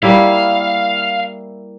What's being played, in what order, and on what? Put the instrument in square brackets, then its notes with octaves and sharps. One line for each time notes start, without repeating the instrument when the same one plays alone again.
[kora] G3 A#3 E4 [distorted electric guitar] F5